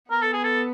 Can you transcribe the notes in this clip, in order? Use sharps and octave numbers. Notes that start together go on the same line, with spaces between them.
B3 A#4
A4
G#4
A4